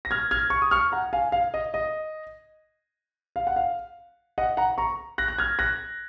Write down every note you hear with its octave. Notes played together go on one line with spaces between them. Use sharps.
A#6
F6 G#6
F6 G#6
C#6
D#6
C#6 F6
F#5 A#5
F5 G#5
F5
D#5
D#5
F5
F#5
F5
D#5 F#5
F#5 A#5
A#5 C#6
F#6 A#6
F#6
F6 G#6
F#6 A#6